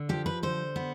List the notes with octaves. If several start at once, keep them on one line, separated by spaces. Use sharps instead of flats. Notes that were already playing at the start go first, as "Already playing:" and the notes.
Already playing: D3
F3 G4
B4
D3 C5
B3